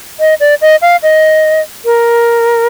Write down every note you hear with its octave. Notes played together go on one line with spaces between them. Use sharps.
D#5
D5
D#5
F5
D#5
A#4